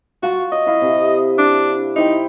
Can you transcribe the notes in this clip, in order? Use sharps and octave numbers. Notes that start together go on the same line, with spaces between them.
F4 F#4 F5 C#6
C#5 D#5
E4 F5
C3
D4
D#4 E4 C5 G5